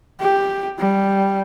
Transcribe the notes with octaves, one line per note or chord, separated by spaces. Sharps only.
G4
G3